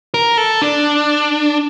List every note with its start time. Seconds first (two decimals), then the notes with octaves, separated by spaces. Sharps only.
0.14 A#4
0.38 A4
0.62 D4